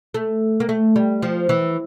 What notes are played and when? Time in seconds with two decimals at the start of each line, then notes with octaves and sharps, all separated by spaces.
0.14 A3
0.60 A#3
0.69 A3
0.96 G3
1.22 F3
1.49 E3